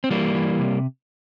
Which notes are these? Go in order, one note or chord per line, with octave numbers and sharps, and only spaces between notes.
C4
E3 G3 A#3
E3
C3